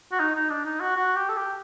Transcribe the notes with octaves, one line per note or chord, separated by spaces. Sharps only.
F#4
D#4
D#4
D4
D#4
F#4
F#4
G4
A4
G4